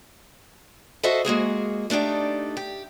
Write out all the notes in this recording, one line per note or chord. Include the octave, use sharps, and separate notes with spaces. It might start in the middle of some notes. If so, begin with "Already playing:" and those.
F#4 A4 C5 D#5 E5
G#3 A#3 F#4 G#4
A3 D4 D#4 G4 D5
G4